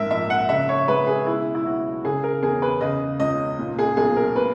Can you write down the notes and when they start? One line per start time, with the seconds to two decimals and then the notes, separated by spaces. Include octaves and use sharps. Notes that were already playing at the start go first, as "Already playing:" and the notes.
Already playing: A#1 G#2 A#4 E5
0.10 A#1 E5
0.30 F#5
0.49 C#3 E5
0.69 C#5
0.88 G#3 B4
1.07 G#4
1.27 B2 E4
1.55 E4
1.66 B1 F#4
2.04 C#3 G#4
2.23 A#4
2.42 E2 G#4
2.62 B4
2.81 C#3 D#5
3.19 C#2 D#5
3.59 A#2
3.79 G#4
3.97 B1 G#4
4.16 A#4
4.36 B2 B4